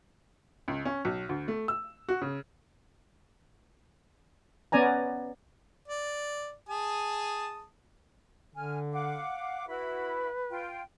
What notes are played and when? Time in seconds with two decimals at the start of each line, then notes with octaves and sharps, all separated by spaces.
0.68 C#2
0.85 C#4
1.05 B1
1.29 D2
1.48 A3
1.68 E6
2.09 F#4
2.22 C#3
4.72 B3 C#4 D5 G#5 A#5
5.88 D5
6.69 G#4 A5 D#6
8.55 D3 G#5 F6
8.92 F5 F#5 D6
9.68 E4 F#4 B4 B5
10.49 F4 G5